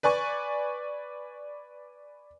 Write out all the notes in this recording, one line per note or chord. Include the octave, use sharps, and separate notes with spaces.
B4 D5 G#5 C#6